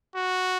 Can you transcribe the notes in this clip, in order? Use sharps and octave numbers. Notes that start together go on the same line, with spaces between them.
F#4